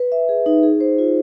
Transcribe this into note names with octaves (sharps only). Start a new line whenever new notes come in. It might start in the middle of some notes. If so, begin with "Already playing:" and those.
Already playing: B4
E5
G#4
D#4
G#4
C5
F4